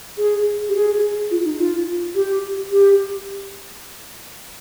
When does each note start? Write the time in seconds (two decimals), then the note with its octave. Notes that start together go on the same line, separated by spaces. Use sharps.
0.18 G#4
0.69 G4
0.74 G#4
1.31 F4
1.44 D#4
1.58 F4
2.15 G4
2.71 G4